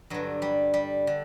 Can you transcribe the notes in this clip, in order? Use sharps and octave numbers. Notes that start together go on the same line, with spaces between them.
G2 D3 F#3
G3
G3
D3